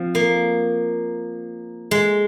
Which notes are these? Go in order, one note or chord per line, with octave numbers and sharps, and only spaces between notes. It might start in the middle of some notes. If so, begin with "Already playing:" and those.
Already playing: F3 C4
A#3
G#3